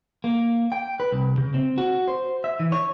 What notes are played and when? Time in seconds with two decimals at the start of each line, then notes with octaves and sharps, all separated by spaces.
0.24 A#3
0.72 G5
1.00 B4
1.12 C2
1.38 C#3
1.54 C4
1.78 F#4
2.08 C5
2.44 E5
2.60 E3
2.72 C#5